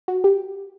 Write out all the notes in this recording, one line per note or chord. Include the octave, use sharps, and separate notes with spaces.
F#4
G4